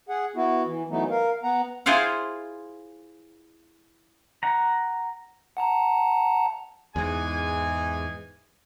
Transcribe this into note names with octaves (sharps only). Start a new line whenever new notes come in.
G#4 F#5
B3 E4 F#4
E3
E3 F#3 A3 B3 D#4
A#4 F5
B3 F#5 A#5
E4 F4 G#4 C5 F5 F#5
F#5 A#5
F#5 A5 A#5
E2 G#2 E3 G#3 G#5